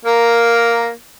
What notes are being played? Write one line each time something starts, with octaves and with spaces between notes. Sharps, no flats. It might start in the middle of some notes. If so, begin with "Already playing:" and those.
A#3 A#4